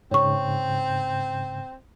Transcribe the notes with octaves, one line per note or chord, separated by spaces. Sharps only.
G#2 C#3 C4 C#5 C#6